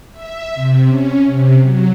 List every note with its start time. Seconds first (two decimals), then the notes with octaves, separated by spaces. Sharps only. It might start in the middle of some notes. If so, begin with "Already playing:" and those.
0.12 E5
0.55 C3
0.88 C#4
1.26 C3
1.62 F#3